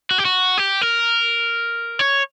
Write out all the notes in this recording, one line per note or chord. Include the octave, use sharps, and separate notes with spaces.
F#4
G4
F#4
G4
A#4
C#5